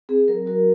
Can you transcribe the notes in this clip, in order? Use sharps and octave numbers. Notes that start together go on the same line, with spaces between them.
C4 G#4
F#3 A#4
F#4 A#4